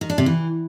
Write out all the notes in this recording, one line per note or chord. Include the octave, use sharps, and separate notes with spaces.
D#3
D4
C3
E3